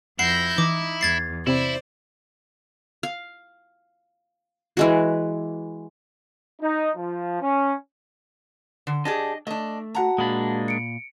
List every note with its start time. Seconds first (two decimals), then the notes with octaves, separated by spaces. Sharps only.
0.19 F2 E4 F#5 G6 A#6 C7
0.58 E3 D#4 D6
1.01 E2 G#6 A6 C7
1.47 C3 C4 E4 C5 D5 B5
3.03 F5
4.77 E3 G#3 F#4
6.62 D#4
6.95 F3
7.41 C#4
8.87 D3
9.05 D4 G4 G#4 D#5
9.47 A3 D4 D#5
9.95 F#4 F#5 A5 A#5
10.18 A#2 G#3 A#3 D4 B5
10.68 C#7 D7